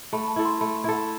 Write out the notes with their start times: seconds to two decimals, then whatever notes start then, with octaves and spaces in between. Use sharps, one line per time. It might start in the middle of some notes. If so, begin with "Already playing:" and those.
0.13 A3 B5
0.23 B5
0.28 A5
0.36 E4 A4
0.45 C6
0.61 A3 B5
0.84 E4 A4
0.96 B5